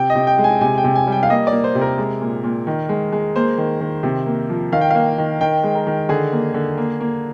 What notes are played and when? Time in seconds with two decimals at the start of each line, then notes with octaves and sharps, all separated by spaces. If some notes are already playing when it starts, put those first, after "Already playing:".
Already playing: C3 G5
0.10 D#5
0.15 C3
0.27 G5
0.38 G#3
0.44 G#5
0.61 C3 G#5
0.78 G5
0.84 C3
0.95 G#5
1.07 G3
1.12 G5
1.23 F5
1.30 A#3 D#5
1.47 D5
1.52 A#3
1.64 C5
1.75 C3
1.82 A#4
1.98 G#3
2.21 A#2
2.44 A#2
2.67 D#3
2.89 G#3
3.12 G#3
3.35 A#3 C5
3.58 D#3
3.81 D#3
4.03 C3
4.26 A#3
4.49 F3
4.72 D#3 F5
4.81 G5
4.91 A#3 F5
5.18 D#3
5.41 D#3 G5
5.64 G#3
5.75 A#4
5.87 D#3
6.09 D3 G#4
6.32 A#3
6.54 D3
6.78 A#3
7.00 A#3